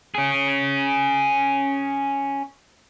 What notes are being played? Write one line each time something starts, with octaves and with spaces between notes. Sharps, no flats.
C#4 G#4